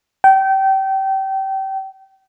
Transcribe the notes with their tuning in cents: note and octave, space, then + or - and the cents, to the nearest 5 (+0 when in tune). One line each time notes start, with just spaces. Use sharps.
G5 -25